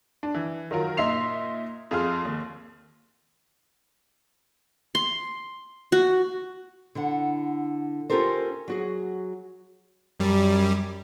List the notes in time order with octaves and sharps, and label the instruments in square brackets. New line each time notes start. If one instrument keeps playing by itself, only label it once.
[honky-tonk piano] D4
E3
D#3 F#3 F4 A#4
A#2 D#4 E5 C6 C7 F7
F2 F4 G#4 C6 F6
D#2
[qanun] C6
F#4
[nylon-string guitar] D3 E4 F#5
C#4 F4 G4 A4 A#4 C5
F#3 F#4 G#4
[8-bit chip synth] F#2 G3